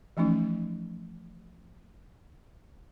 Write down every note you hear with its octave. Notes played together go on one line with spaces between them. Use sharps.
E3 F3 A3 C#4 D#4